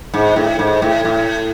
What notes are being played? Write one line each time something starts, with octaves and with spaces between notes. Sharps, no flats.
G#2
A2
G#2
A2
A2